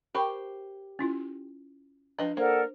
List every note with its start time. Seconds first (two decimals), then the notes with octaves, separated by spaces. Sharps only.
0.15 G4 A#4 C5 B5 C#6
0.99 C#4 E4 F4
2.18 F3 D4 B4 D#5 B5
2.37 A#3 A4 A#4 C5 D5 F#5